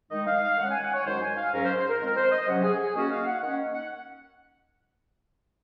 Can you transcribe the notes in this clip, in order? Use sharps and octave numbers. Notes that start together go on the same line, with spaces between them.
D#3 G#3 D#4 D#5
F5
F5
D#3 G#3 C#4 F#5
G#5
F#5
C#5
F#2 D#3 G#3 D#4 C5
G#5
F5
G#2 F#3 C#4 A#4
C5
C5
A#4
F2 D#3 G#3 C4 A#4
C5
D#5
C3 F#3 C#4 F#5
G#4
G#4
D#3 A#3 C#4 F#4
F5
F#5
D#3 A#3 C#4 F#5
F#5